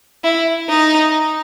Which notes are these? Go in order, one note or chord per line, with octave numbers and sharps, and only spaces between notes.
E4
D#4